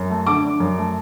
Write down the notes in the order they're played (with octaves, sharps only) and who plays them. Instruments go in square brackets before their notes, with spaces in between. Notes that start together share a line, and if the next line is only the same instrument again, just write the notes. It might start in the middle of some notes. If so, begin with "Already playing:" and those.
Already playing: [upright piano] F#2
A3
D3 D6
D4
F#2
A3